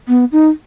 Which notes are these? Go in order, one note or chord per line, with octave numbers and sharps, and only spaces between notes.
B3
D#4